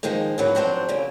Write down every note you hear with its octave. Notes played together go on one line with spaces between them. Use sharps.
D#3 F3 G#3 A#3 D#4
D2 G#2 E3 F#3 A#3 B4
F3 F#3 C4 D4 F#4 C5
A#2 C#3 A#3